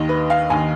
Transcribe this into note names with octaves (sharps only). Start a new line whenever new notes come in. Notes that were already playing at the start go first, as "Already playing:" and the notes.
Already playing: D#2 D#3 D#5
B4
F5
D#2 D#3 G#5